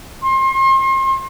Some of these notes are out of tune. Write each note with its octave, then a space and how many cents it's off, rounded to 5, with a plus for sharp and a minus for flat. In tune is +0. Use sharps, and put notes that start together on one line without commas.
C6 +35